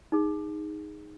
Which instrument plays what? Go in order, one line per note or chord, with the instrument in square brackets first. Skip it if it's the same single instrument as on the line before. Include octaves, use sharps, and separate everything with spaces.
[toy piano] D#4 G#4